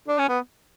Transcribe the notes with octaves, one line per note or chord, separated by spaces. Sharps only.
D4
C#4
B3